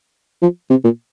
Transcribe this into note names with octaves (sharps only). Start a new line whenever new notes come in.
F3
C3
A#2